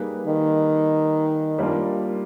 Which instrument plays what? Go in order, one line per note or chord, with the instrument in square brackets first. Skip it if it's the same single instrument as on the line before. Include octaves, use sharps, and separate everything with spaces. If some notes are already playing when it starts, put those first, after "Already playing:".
Already playing: [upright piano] G3 A#3 D#4 G#4 B4
[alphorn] D#3
[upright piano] G3 A#3 D4 F4